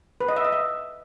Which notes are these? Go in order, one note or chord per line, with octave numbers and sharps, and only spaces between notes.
B4
D#5
E5
D#5
E5